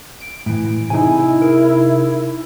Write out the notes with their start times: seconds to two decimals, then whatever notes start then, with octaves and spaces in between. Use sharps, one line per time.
0.20 D7
0.46 A2 E3
0.90 C3 D#4 E4 G#4 G#5
1.42 G#4 A#4